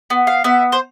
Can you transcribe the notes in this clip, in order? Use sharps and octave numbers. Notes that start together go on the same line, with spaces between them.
B3
F5
B3 E5
C5